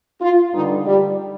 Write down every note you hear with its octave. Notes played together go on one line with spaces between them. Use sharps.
F4
G2 D3 D#4
G3